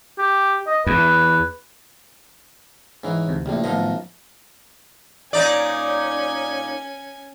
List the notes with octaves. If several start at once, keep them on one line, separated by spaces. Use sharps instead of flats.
G4
D#5
E2 B4
G#2 E3 C#4
D2 C3
A#1 A2 C#3 A3 G4
F#2 A2 D#3 F3 B3 D#5
A#2 C#4 D#4 D5 G#5